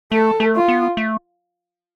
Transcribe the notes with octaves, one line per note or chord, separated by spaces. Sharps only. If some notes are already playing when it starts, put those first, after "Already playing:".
A3 A4
A3
F4
B3
A3